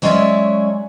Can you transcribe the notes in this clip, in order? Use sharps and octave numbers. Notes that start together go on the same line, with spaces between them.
F#3 G#3 C#4 C#5 D5 E5